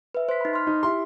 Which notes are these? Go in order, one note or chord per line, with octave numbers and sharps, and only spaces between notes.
B4 E5
C5 B6
D#4 B5
C6 F6
D#4
E4 G4 C6